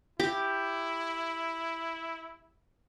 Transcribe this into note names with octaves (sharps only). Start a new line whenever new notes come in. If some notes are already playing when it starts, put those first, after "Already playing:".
E4 G4 D6